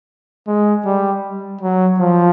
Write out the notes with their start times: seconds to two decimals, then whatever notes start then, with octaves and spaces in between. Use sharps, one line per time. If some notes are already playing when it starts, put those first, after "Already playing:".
0.47 G#3
0.85 G3
1.61 F#3
1.99 F3